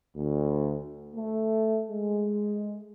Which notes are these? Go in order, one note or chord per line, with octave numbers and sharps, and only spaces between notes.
D2
A3
G#3